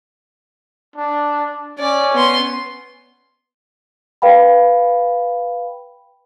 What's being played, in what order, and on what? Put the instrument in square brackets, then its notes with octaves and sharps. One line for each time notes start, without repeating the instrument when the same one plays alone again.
[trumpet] D4
[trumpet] C#4 [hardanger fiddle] D5
[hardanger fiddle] B3 C6
[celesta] B4 F5 G5 B5